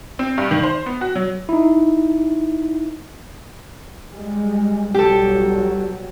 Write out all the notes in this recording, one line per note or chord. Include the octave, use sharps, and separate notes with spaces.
C4
G2
D#3
C5
B3
F#4
F#3
D#4 E4
G3 G#3
B1 F#3 G3 G4 A4